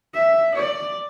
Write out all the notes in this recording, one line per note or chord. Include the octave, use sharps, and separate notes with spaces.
E5
D5